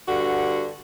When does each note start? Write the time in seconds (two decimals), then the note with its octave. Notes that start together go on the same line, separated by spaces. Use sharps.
0.07 G2 D3 F#4